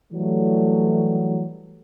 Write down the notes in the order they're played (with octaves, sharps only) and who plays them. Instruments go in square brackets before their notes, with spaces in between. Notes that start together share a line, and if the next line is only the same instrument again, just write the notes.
[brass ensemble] E3 F#3 G3 A3